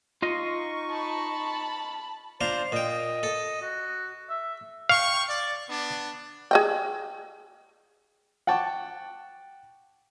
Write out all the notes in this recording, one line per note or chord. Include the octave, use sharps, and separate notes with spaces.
D#4 F4 D#5 C#6
A5 B5
D4 F4 C5 A#5
A#2 D#5 G5
A4
F#4
E5
F5 G5 C#6
D5
B3 D4
G#4 D#5 G5
F#5 G5 A5 C#6 D6